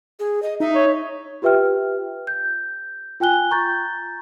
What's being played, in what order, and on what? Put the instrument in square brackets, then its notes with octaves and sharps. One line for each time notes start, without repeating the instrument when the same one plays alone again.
[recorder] G#4
D#5
[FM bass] D#4 [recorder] E5
[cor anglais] C#5
[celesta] F4 G4 B4 E5 G5 F6
G6
F4 G5 G#5 F#6 G7
A#5 C#6 G6 A6